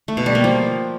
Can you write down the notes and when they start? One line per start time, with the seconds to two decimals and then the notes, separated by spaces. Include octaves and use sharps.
0.08 A3
0.17 B2
0.26 G3
0.35 A#3
0.44 F3